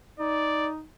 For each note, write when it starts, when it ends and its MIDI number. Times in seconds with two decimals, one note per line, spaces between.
0.19 0.83 63
0.19 0.70 74